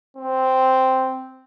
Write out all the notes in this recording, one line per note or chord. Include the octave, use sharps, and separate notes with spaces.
C4